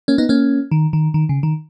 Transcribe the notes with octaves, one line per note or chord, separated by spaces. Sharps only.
A#3 C#4
B3 D#4
A#3 C#4
D#3
D#3
D#3
C#3
D#3